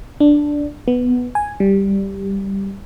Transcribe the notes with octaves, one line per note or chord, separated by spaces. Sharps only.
D4
B3
G#5
G3